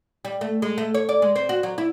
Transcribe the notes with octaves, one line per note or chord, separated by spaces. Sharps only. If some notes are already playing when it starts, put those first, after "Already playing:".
G3
A3
G#3
A3
C#5
D5
G#3
C4
F#4
F#3
E4